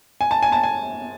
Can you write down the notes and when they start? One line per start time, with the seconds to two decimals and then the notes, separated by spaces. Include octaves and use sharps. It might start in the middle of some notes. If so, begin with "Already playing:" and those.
0.21 G#5
0.31 A5
0.43 G#5
0.52 A5
0.63 G#5